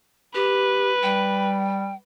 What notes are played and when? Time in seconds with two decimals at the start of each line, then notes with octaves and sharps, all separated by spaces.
0.35 G4 B4
1.03 G3 G5